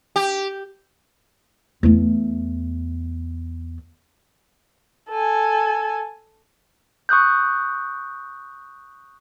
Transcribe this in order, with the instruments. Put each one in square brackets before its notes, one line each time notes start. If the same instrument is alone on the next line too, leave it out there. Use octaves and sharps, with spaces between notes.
[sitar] G4
[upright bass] E2 A3
[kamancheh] A4 G#5
[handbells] C#6 D#6 F#6 G6